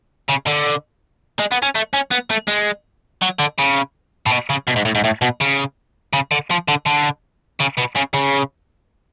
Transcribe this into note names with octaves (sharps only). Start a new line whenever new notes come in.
C#3
D3
G#3
B3
C#4
A3
C#4
B3
A3
G#3
F#3
D3
C#3
A2
B2
C#3
B2
G#2
A2
G#2
A2
B2
C#3
C#3
D3
F3
D3
D3
C#3
B2
C#3
C#3